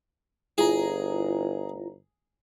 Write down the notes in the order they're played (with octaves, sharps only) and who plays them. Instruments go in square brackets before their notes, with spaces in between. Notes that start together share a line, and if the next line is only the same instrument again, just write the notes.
[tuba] G1 [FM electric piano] E4 F4 A#5 [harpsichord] G#4